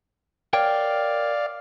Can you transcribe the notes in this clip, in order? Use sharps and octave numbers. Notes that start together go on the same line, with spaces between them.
A#4 C#5 D5 F5 G5